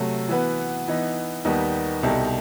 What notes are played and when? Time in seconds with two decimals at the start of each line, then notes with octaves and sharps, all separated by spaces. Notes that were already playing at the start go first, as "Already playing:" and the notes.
Already playing: C3 F#3 A3
0.29 E3 B3 F#4 B4
0.88 E3 B3 D#4
1.45 D#2 D#3 G3 B3
2.03 C2 B2 G3 D#4 A4